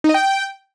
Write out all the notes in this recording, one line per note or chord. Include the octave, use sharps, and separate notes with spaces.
D#4
D#5
G5